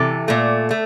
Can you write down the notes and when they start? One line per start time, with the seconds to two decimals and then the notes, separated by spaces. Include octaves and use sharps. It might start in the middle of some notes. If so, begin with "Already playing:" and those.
Already playing: C3 E3 A4
0.28 A#2 A3
0.71 A3